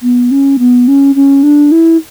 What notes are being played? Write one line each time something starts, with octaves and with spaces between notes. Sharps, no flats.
B3
C#4
B3
C#4
C#4
D4
E4